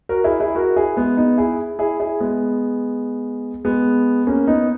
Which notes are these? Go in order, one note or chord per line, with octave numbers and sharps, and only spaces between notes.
F#4 A#4
E4 G#4
E4 G#4
F#4 A#4
E4 G#4
G#3 B3
B3 D#4
E4 G#4
E4 G#4
E4 G#4
G#3 B3
G#3 B3
A#3 C#4
B3 D#4